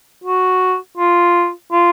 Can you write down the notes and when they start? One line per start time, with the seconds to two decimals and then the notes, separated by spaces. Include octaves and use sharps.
0.24 F#4
0.97 F4
1.72 F4